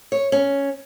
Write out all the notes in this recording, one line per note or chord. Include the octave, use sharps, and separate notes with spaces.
C#5
C#4